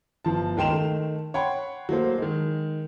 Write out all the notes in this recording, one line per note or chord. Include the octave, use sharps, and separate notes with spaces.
G1 F3 A5
C#2 D#3 G5 C6 E7 F7
D#3 A3
C#5 F#5 G5 B5 C6
F#3 A3 A#3 C5
D#3 G#3